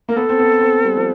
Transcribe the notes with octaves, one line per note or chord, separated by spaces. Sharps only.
A#3 A#4
B3 A4
C4
B3
C4
G3
F3